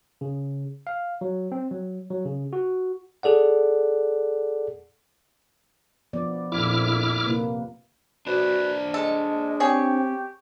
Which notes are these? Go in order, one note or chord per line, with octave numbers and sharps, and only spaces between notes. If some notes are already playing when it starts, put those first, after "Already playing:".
C#3
F5
F#3
C4
F#3
F#3
C#3
F#4
G#4 A4 D5 F#5
F3 B3 D5
A#1 F2 E4 D6 F6
C3 A#3 B4
D4 F#4 B4 C5 D5
G#3 A4 D#5
C4 G4 G#4 C#5